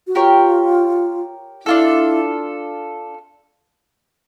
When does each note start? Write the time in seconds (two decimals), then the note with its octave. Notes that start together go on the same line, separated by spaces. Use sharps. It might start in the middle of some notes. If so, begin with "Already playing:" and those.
0.07 F#4
0.15 F4 G4 A#4 C#5
1.66 D4 E4 F4 A4